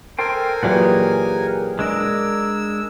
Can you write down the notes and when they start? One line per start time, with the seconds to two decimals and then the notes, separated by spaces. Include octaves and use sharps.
0.19 A4 A#4 C5 G5 G#5
0.63 A#2 E3 F#3 G4 G#4 F#5
1.79 G#3 D4 A#4 E6